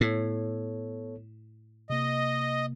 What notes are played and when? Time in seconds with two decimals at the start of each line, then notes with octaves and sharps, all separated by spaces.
0.01 A2 B3 A4 C#5
1.90 C3 A#3 D#5